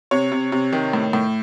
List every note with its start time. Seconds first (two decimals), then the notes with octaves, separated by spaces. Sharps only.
0.11 C3 C#5
0.32 C3
0.52 C3
0.73 D#3
0.93 A2
1.13 A2